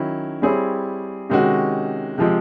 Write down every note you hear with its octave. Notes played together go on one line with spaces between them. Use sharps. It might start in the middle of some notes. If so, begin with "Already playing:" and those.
Already playing: D#3 F#3 C#4 E4
G3 C4 E4 G#4 C#5
C3 D#3 G#3 C#4 F#4
C3 F3 G#3